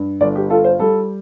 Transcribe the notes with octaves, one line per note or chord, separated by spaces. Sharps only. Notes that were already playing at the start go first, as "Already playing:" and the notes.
Already playing: G2
G1 D5
G4
F4 A4
C5
G3 A4